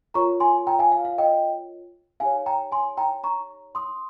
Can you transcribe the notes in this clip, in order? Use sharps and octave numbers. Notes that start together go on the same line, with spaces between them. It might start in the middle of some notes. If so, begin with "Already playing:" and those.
F4 A#4 C#5 A#5 C#6
G#5 C6
G5 A#5
F5 G#5
F5
F5
D#5 G5
D#4 G4 C#5 F5 G#5
G5 A#5
G#5 C6
G5 A#5
A#5 C#6
C6 D#6